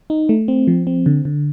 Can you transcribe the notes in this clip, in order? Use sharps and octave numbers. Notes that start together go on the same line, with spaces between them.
D#4
A3
C4
F3
C4
D3
D3